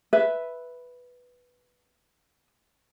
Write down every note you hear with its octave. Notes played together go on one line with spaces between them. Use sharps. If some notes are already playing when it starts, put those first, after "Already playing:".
B4 E5